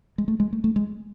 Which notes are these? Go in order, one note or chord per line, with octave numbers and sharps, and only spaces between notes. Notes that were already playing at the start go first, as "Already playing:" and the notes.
G#3
A3
G#3
A3
A3
G#3